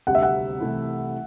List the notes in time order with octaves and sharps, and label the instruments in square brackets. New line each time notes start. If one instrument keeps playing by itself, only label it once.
[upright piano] D2 C3 G3 C4 [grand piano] F#5
[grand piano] E5
F#5
[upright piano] C2 C3 E3 A3 E4